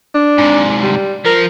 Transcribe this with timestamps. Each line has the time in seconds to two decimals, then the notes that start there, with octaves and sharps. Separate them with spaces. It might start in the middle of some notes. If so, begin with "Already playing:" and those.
0.15 D4
0.38 G#2 C3
0.82 G3
1.25 F3 A#4